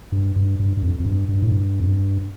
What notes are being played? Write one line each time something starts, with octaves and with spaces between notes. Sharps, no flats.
G2
G2
G2
G2
F2
F2
G2
G2
A2
G2
F2
G2